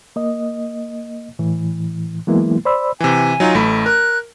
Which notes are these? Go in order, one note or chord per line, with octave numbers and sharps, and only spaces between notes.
A#3 D#5
A2 E3
E3 F#3 G#3 A#3 B3 E4
C5 D5 B5 E6
C3 E3 G#5
F#3 D#4 F4
A1 A3 B5
A#4 F#6